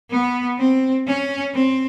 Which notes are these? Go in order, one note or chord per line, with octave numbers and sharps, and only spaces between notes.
B3
C4
C#4
C4